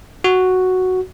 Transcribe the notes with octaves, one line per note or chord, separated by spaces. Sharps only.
F#4